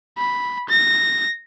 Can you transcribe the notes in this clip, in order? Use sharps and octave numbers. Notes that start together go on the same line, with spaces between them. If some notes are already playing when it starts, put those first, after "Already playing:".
B5
A#6